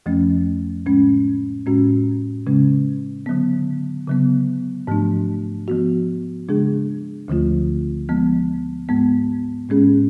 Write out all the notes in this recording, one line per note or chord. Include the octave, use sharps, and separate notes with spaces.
F2 F3 A3 C#4
A2 G#3 C#4
A2 G#3 C#4 F#4
C#3 G#3 C#4
D3 F#3 B3
C#3 F#3 B3
G#2 F3 A3 D4
F3 B3 F#4
C#3 G#3 D4 G#4
D2 D3 F3 A3 F4
F3 G#3 B3
G#2 G#3 B3
A2 G#3 C#4 G#4